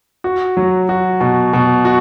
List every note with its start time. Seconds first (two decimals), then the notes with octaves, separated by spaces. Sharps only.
0.24 F#4
0.57 F#3
0.89 F#4
1.20 B2
1.53 B2
1.85 F#4